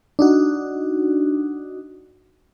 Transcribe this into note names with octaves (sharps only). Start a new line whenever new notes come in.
D4 D#4 F#4